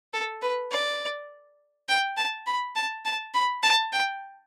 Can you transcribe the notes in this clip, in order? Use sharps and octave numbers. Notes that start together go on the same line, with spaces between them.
A4
B4
D5
G5
A5
B5
A5
A5
B5
A5
G5